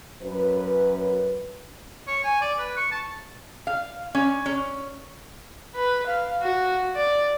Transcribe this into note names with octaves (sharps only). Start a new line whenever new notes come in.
F#2 B4
C#5
G#5
D5
B4
C#6
A5
F5
C#4
C#4
B4
F5
F#4
D5